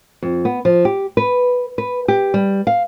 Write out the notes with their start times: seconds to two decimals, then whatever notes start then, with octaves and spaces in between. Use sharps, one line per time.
0.23 F2
0.45 B3
0.65 F3
0.85 G4
1.17 B4
1.78 B4
2.08 G4
2.34 G3
2.67 F5